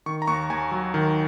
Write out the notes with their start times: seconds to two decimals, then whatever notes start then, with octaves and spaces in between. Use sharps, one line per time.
0.06 D#3 C#6
0.22 A#5
0.27 D#2 C#6
0.50 D#2 G#5
0.71 F#3
0.94 D#3